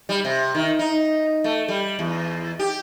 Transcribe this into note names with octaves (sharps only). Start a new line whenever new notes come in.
G3
C3
D#3
D#4
A3
G3
E2
G4